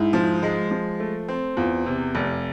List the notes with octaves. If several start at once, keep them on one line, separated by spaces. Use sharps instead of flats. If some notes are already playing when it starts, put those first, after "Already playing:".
Already playing: G#2 E4
F3
G#3
F3
A3
C4
E2 F4
C3
F1